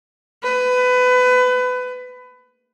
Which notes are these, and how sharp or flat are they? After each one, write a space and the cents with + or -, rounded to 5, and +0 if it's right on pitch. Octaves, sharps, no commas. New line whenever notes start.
B4 +25